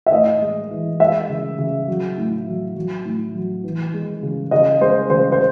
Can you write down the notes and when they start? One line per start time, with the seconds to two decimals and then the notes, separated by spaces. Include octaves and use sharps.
0.06 E5
0.12 A2 D#5
0.42 G#3
0.71 E3
1.00 G#3 E5
1.30 C#3
1.59 C#3
1.88 F#3
2.18 A2
2.47 F#3
2.76 F#3
3.05 A2
3.35 F#3
3.64 E3
3.94 G#3
4.23 C#3
4.51 C#3 D#5
4.81 G#3 C5
5.10 C#3 C5
5.32 C5